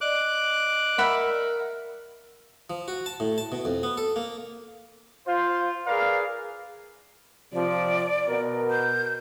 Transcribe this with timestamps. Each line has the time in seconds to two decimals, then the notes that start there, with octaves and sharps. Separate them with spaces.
0.01 D5 D#5 D6 F#6
0.98 A#4 E5 F#5 B5
2.70 F3
2.88 F#4
3.06 A5
3.20 A2
3.38 A5
3.52 B2
3.65 F2
3.83 B3
3.97 A4
4.16 A#3
5.28 F4 C5
5.87 G#4 A#4 B4 D5 F5
7.53 C3 F3 D5
8.27 B2 A#4
8.71 G6